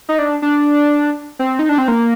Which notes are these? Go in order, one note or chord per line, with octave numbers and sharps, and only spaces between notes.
D#4
D4
D4
C4
D#4
D4
C4
A#3